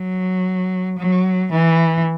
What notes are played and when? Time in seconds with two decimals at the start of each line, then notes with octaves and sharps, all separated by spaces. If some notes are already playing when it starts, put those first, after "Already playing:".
Already playing: F#3
0.98 F#3
1.52 E3